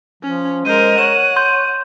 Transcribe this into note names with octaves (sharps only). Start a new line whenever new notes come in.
F3 C#4
G#3 A#4 C5 D#7
C#5 F#5 E7
C6 G6